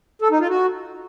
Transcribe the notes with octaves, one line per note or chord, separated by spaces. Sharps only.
A4
D#4
F4
F#4